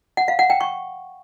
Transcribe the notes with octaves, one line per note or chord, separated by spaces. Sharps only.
F#5
F5
F#5
G5
C#6